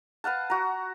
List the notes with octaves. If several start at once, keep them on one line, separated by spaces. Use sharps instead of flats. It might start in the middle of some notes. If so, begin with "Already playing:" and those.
B4 F5 F#5 A5
F#4 A#5